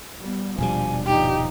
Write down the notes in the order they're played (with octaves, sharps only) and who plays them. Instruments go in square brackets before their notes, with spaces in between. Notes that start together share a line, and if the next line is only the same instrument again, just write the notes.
[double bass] G3 B3
[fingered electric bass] D#1 B2 G3 [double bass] F3 D4 [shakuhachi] G#5
[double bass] G2 F3 [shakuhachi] D#4 [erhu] G4